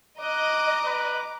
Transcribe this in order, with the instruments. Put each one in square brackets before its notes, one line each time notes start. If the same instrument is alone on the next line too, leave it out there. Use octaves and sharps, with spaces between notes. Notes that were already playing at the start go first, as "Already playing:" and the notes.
[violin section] D#5 [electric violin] A#5 D6 [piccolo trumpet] F#6
[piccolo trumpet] B4